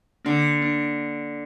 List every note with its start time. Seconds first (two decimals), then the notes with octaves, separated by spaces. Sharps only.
0.25 D3 A#3 D4
0.62 A#3 D4